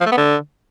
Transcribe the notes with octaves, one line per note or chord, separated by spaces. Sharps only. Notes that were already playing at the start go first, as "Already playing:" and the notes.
F3
A3
B3
D3